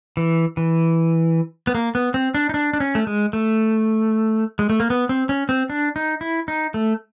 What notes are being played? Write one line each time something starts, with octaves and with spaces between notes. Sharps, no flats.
E3
E3
B3
A#3
B3
C4
D4
D#4
D4
D4
C#4
A3
G#3
A3
G#3
A3
A#3
B3
C4
C#4
C4
D4
D#4
E4
D#4
A3